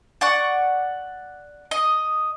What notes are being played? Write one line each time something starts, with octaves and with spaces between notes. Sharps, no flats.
D5 F#5 C#6
D#5